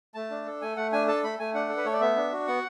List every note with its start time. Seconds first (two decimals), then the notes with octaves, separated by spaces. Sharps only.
0.14 A3 A5
0.31 D4
0.46 A4
0.61 A3 G#5
0.77 A3 F#5
0.92 D4 G#5
1.07 A4 A5
1.23 A3 B5
1.39 A3 G#5
1.54 D4 F#5
1.69 A4
1.77 B4
1.85 A3 C#5
1.93 D5
2.00 B3 E5
2.16 D4
2.32 F#4
2.47 B3 F#5